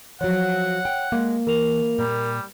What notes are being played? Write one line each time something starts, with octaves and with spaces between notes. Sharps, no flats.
F3 F#3 C#5 F#5
G5
G#3 A#3
E3 A#4 F7
A#2 G3